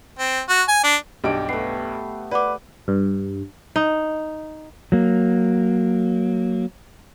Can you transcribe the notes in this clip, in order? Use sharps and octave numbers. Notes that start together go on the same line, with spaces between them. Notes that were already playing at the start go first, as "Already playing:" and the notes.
C4
F#4
G#5
D4
B1 G2 G4 D7
A3 B3 C7
B4 D5 F#5 D6
G2
D#4
F#3 A#3